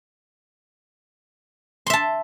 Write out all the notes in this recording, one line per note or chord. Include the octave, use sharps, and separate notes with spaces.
E5 A5 C6